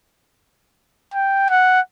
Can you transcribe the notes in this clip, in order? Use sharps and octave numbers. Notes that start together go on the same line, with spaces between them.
G5
F#5